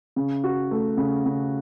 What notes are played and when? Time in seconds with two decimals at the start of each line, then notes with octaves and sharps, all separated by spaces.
0.16 C#3
0.44 F#4
0.71 A3
0.97 C#3
1.26 C#3